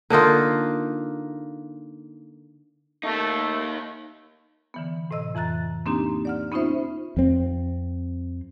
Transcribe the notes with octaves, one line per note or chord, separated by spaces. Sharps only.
D3 A#3 D#4 F4
A3 A#3 D#4
D3 E3 B3
A2 C3 D#5 E6
F2 E3 A#5 F#6 A6
A#3 C4 D4 D#4 G4
D5 F#5 F6
B3 C#4 D#4 F4 C5 E5
F2 C4